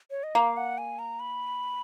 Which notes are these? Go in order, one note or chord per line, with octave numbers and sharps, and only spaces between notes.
C#5
D#5
A#3 F5
F#5
G#5
A#5
B5